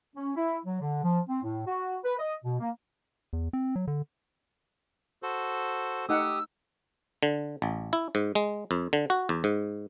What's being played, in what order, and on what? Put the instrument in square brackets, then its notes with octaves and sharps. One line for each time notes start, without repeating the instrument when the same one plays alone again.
[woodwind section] C#4
E4
F#3
D3
F3
C4
A2
F#4
B4
D#5
B2
A#3
[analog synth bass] E2
C4
F#3
D3
[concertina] F#4 A4 C5
[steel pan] A3 D#4 F#5 [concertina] G4 D#6 [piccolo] E6
[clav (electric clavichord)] D3
A1
E4
G#2
G#3
F2
D3
F#4
E2
G#2